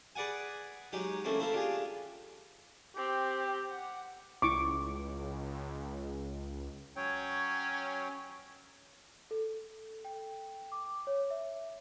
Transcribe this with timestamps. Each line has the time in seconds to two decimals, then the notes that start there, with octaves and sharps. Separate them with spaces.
0.15 G#4 B4 D5 F#5 G#5
0.93 F#3 G#3 D#4 G4
1.24 C#3 E3 A3 A#3 C4
1.39 C4 E4 A4 F5
1.53 D4 F4 G4 G#4
2.97 C4 G4
3.70 F#5
4.42 C#2 E4 C#6 D6
6.96 F#3 C#4 C#5 G5
9.31 A4
10.05 G5
10.72 D6
11.07 C#5
11.30 E5